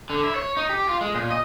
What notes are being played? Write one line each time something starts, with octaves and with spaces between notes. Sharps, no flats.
D3
E4
C#5
D#4
G4
F4
G#3
A#2
D#5